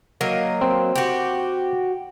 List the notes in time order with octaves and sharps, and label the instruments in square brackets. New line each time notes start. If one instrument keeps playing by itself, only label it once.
[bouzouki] F#3 A#3 D#5
[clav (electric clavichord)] C4
[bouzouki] F#4 G4